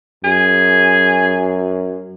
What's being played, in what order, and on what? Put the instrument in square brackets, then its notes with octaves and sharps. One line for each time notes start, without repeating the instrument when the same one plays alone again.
[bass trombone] F#2 [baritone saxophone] G#4